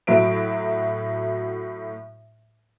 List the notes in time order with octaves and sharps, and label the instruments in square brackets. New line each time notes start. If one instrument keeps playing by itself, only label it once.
[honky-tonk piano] A2 F#3 E5 D7